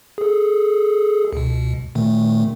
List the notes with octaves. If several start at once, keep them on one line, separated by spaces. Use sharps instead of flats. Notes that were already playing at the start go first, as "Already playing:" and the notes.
G#4 A4
C#2 B2
A#2 D#3 A3